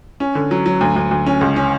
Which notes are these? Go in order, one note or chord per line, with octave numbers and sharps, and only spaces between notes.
C#4
D3
F#3
F#3
D2
D2
D2
C#4
C#2
C#4